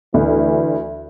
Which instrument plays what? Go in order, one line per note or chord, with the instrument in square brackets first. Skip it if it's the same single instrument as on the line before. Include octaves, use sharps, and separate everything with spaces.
[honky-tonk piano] D2 [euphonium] E3